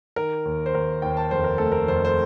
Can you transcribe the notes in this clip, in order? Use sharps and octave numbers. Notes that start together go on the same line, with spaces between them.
D#3 A#4
D#2
C5
D#2 A#4
D#2 G5
A5
F1 C5
A#4
A3 A4
A#4
F1 C5
C5